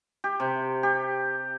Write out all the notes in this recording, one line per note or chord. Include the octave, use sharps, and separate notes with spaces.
G4
C3
G4